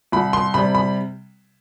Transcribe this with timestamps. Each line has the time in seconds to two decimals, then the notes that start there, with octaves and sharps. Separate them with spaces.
0.12 C2 B5
0.33 C6
0.54 C3 G3 B5
0.75 B5